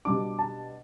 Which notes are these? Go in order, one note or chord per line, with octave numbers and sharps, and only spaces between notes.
B2 G3 D4 D6
A5